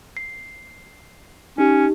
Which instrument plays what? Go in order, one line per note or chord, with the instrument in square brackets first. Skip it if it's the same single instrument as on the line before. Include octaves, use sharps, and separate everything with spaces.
[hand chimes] C7
[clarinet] C#4 [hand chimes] D#4 G4